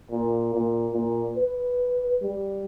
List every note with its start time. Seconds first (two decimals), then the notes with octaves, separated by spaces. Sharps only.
0.11 A#2
0.54 A#2
0.93 A#2
1.37 B4
2.22 G3